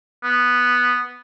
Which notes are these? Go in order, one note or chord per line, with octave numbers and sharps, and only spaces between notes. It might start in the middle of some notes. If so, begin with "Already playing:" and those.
B3